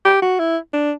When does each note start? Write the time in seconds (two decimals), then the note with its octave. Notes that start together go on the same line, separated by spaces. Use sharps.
0.05 G4
0.22 F#4
0.39 E4
0.74 D4